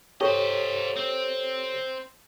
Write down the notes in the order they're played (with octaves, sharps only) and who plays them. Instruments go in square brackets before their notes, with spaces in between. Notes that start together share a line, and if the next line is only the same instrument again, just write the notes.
[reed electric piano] G4 A4 C#5 [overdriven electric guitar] C5 D#5
[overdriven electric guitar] C4